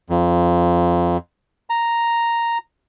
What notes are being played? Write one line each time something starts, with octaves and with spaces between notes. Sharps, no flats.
F2
A#5